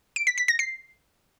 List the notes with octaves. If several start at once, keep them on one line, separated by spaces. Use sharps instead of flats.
D7
B6
B6
A#6
C7